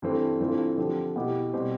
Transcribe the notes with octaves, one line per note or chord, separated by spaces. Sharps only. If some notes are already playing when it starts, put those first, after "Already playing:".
G2 E3 A3 C4
G2 E3 A3 C4 F4
D3 F3 C4 G4
B2 B3 E4 G4
B2 G3 C4 G4